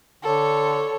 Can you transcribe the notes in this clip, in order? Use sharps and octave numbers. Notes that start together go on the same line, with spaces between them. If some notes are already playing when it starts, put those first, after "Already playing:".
D3 A4 C#5